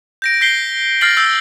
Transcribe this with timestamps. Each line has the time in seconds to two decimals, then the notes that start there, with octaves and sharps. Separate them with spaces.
0.22 G6 A#6 D7
0.41 G6 B6 C7 G7
1.01 F6 A6 A#6 C7 F#7
1.17 E6 G6 A6